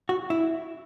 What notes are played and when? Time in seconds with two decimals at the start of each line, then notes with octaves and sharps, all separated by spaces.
0.09 F#4
0.30 E4